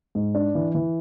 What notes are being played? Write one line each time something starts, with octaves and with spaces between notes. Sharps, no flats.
G#2
D4
E3
E3